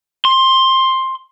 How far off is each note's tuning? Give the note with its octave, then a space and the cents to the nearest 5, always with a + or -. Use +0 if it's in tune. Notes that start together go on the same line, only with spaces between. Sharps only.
C6 +10